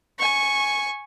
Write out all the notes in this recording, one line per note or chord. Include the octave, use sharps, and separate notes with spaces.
G#5 C#6